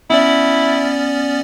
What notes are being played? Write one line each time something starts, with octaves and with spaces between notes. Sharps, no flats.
B3 C#4 E4 D5